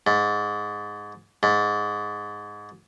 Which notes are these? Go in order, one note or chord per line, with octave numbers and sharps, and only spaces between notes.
G#2
G#2